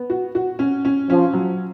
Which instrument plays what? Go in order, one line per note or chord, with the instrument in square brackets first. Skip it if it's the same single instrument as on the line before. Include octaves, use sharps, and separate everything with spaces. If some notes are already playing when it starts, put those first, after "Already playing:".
Already playing: [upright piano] B3
F#4
F#4
C#4
C#4
[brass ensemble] F3 [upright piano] C#4
[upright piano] F#3